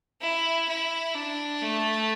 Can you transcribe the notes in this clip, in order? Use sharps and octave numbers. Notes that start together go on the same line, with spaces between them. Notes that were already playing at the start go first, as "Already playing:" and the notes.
E4
E4
D4
A3